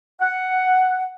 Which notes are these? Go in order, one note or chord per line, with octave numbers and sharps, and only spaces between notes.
F#5